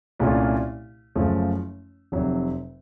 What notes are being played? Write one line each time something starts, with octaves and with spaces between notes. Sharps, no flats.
C2 A#2 A3 C#4 F4
F#1 F#2 F3 A3
F1 F2 C3 F#3